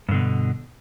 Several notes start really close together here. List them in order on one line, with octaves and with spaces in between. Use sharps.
G2 D3 B2